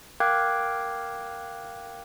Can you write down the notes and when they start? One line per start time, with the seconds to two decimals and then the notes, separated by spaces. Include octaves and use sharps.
0.20 A#4 F5 G5 D6 F#6 G#6